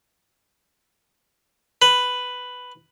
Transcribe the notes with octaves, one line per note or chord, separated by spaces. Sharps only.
B4